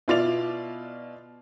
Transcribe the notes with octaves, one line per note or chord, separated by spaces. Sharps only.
B2 E4 F4 D5 A6 F7